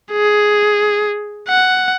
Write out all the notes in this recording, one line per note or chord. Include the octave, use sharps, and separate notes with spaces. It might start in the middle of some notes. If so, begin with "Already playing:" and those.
G#4
F#5